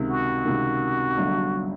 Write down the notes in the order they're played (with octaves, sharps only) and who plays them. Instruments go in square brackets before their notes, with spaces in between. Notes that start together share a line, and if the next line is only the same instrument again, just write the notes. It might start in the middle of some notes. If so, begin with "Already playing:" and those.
Already playing: [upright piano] C#2 C3 D#3
[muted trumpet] F#4
[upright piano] C#2 C3 D#3
G1 G2 D3 F#3